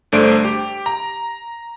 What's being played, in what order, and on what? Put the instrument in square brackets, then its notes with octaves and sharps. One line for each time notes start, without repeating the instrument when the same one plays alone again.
[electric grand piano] G1 A3 D4 C5 D7
G4
A#5